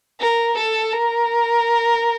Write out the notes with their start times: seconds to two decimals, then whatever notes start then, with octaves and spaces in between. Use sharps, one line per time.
0.21 A#4
0.58 A4
0.92 A#4